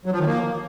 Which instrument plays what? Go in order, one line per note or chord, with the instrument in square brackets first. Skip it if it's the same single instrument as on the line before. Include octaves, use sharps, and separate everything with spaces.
[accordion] F#3
F3
D#3
A#3